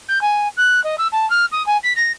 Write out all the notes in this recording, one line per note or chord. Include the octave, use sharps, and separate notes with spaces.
G6
G#5
F#6
D#5
E6
A5
F6
D#6
G#5
B6
A#6